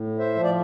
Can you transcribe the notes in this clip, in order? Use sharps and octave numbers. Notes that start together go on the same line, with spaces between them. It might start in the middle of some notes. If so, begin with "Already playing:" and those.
Already playing: A2
C5 E5
F3
D5